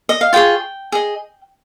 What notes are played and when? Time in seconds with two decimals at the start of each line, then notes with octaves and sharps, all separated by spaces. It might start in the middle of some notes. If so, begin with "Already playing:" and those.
0.09 D#5
0.21 F5
0.33 F4 G#4 C#5 G5
0.92 G#4 D#5